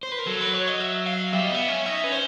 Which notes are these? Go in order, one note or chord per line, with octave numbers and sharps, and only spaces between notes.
C5
B4
A#4
F#3 A4
B4
C#5
D#5
E5
F5
G3 E5
D#5
B3 E5
C#4
D#4 E5
C#4 B4
C5